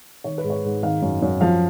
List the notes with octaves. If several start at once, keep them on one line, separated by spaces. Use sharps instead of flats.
D#3 C#5
B4
G#2
C#5
G#2
D#3 F5
F#2
F#2
F3 F5